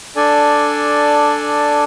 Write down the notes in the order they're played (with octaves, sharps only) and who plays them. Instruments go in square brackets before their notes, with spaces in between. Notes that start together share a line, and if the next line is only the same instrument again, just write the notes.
[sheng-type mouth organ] D4 A4 D5 G#5